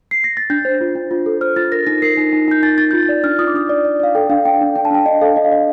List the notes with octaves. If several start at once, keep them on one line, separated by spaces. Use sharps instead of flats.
C7
A#6
A6
D4 G6
C5
F4
D4
F4
A4
C5 F6
F4 A6
A#4 A#6
D#4 A#6
A#4 C7
D#4
D#4
D#4 G6
D#4 A6
D#4 A6
F4 G6
A6
D5
D4 F6
F4 D#6
D6
D4 D#6
D5
D5
D5 F5
A4 G5
D4 F5
D4 G5
D4
D4 G5
A5
D4 G5
D4 D#5
A4 F5
D4 D#5
F5
D4 D#5